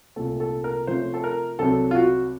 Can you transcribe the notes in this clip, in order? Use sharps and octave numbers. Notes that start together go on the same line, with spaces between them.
C2 A#2 A3 C4 A4
A4
A#4
C3 F3 A3 C#4 C5
A4
A#4
C2 C3 F#3 C4 A4
F4
F#4